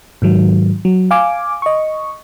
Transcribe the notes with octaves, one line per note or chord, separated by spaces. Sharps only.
G#2 D#3 F#3
F#3
F5 G#5 D6
D#5 C#6